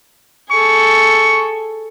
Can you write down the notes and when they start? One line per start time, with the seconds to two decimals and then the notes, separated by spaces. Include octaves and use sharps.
0.51 G#4 A4 C#6